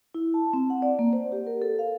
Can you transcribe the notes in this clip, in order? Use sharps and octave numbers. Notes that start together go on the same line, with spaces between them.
E4
A5
C4
F#5
D5
A#3
C5
G4
A#4
A4
F5